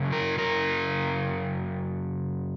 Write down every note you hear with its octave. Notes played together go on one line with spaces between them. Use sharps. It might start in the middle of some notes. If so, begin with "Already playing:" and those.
Already playing: F#2 C#3
A#4
A#4